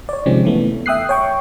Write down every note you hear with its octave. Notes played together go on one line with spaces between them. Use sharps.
C#5 D5
C3 D#3 F3 G#3 C4 C#4
E3 A3 B3
E5 G5 D#6 F#6 C7
C#5 G5 C#6